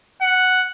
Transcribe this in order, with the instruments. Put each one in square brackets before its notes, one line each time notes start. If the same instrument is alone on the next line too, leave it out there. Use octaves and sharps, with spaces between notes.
[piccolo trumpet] F#5